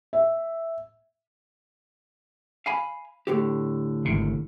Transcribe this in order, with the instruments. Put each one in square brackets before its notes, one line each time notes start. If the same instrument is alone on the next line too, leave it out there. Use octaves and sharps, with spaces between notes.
[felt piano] E5
[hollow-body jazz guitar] F5 G#5 B5
A2 D3 G4
[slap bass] G#1 C3